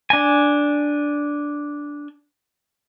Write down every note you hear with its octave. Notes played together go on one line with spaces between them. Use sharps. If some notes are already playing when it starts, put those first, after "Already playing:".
D4 G#5